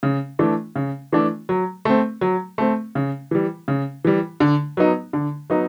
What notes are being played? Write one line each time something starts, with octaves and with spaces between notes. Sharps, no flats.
C#3
E3 A3 D4
C#3
E3 A3 D4
F#3
A3 C4
F#3
A3 C4
C#3
E3 G3
C#3
E3 G3
D3
F#3 B3 D#4
D3
F#3 B3 D#4